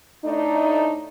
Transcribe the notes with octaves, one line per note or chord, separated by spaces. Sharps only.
A2 A3 D4 D#4